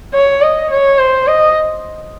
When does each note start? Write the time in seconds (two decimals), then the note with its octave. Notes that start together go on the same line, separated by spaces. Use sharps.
0.14 C#5
0.42 D#5
0.71 C#5
0.99 C5
1.27 D#5